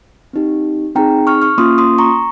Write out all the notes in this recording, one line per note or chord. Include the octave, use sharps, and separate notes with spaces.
C4 D#4 G4
C4 D#4 G#4 G5 A#5
C#6 F6
C#6 F6
A#3 C#4 F4 C6 D#6
C6 D#6
A#5 C#6